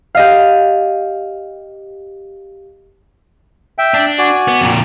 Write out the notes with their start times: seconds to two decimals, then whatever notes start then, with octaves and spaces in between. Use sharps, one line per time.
0.15 G4 D#5 F5
3.78 E5 G5
3.94 D4
4.18 F#4 D5 G#5
4.48 B3
4.61 F2 A#2